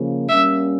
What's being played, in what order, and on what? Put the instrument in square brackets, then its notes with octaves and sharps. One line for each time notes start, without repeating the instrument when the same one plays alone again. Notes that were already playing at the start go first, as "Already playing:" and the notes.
Already playing: [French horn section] C#3 F3 A#3
[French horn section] G3 A#3 C#4 [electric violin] E5